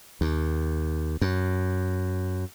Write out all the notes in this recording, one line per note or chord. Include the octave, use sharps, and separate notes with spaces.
D#2
F#2